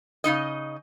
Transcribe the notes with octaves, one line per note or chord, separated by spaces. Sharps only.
C#3 F3 D#4 D#5